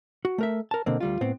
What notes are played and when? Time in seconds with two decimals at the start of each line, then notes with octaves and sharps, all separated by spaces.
0.25 F#4
0.38 A3 A#4 E5
0.71 A#4 A5
0.86 B2 D3 A#3 C4
1.00 D2 G3 F4
1.21 A2 B3 C4